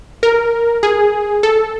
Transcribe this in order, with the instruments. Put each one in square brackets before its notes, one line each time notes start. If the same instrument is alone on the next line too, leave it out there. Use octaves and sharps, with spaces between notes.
[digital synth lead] A#4
G#4
A4